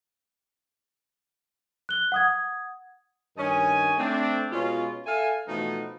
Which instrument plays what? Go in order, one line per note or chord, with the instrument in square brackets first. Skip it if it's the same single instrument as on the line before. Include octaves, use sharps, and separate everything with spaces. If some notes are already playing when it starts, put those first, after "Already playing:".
[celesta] F#6 G7
F#5 D#6 G#6
[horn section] G2 D#3 C#4 D#5 G#5
A3 C4 D4
B2 G#3 C#4 F4
A4 E5 F5 G#5
B2 E3 F3 A3 B3 D#4